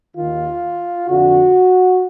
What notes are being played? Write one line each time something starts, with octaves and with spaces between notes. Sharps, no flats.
D#2 D#3 F4
F2 D3 F#4